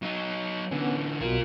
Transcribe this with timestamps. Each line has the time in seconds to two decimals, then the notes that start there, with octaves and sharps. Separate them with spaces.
0.02 F#3 D#4
0.71 D3 E3 B3 C#4
1.21 B1 B2 F4 A#4